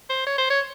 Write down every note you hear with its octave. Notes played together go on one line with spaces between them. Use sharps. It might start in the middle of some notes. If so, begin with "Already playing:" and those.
C5
C#5
C5
C#5